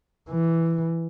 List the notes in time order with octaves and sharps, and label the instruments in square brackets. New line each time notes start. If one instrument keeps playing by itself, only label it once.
[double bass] E3